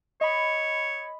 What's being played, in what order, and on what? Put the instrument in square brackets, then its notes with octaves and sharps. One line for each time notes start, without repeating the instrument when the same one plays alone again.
[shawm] C#5 [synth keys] D#5 B5